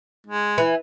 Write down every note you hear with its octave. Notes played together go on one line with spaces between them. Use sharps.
G#3
E3